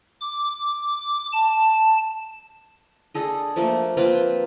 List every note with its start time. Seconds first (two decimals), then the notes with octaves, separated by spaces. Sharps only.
0.21 D6
1.33 A5
3.15 D4 G#4 A4 D#5
3.56 F3 A3 A#3
3.97 A#3 C4 F4 B4